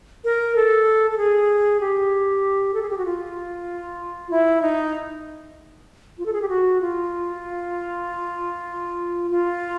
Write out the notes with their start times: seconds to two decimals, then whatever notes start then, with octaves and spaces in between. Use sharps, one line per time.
0.24 A#4
0.56 A4
1.11 A4
1.18 G#4
1.80 G4
2.74 A4
2.82 G#4
2.90 G4
2.98 F#4
3.05 F4
4.31 E4
4.62 D#4
6.18 F4
6.26 A4
6.33 G#4
6.42 G4
6.49 F#4
6.81 F4
9.31 F4